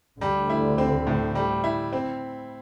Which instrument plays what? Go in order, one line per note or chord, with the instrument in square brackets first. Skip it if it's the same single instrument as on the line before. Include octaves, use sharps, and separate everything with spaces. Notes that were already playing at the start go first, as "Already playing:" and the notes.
[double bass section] D2 D3 [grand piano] G3
[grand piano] E4
C4
A2
G3
E4
C4